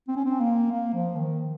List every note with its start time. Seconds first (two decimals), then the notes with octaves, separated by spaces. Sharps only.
0.08 C4
0.16 C#4
0.25 C4
0.40 A#3
0.72 A#3
0.94 F3
1.15 D#3